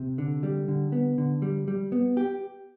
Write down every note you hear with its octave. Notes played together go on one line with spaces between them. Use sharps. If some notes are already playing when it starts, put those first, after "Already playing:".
Already playing: C3
D3
G3
D3
B3
D3
G3
G3
B3
G4